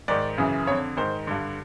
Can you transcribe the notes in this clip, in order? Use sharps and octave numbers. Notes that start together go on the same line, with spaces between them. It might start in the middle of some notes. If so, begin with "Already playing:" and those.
G#2 D#3 D5
F#2 C#3 E3
F2 D3 C#5
G#2 D#3 C5
G2 D3